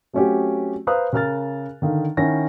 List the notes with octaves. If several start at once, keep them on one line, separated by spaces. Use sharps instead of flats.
F#3 A3 C4 C#4 F#4 G4
B4 C5 F5 A#5 D#6 F#6
C#3 A#4 F6 A6
D3 D#3 F5
D#3 C#4 E4 F#5 A#6